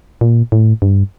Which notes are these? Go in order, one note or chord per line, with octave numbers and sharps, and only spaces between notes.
A#2
A2
G2